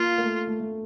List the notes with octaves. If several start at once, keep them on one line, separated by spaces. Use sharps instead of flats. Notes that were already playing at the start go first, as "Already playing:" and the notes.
Already playing: A#3 F4
A#3
A3
A3
A3